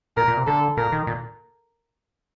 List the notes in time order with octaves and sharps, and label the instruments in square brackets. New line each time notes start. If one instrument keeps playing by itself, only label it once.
[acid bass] A#2 [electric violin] A#4
[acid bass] A#2
C3
[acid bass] D3 [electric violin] A4
[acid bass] A#2 [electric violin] A#4
[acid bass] D#3
A#2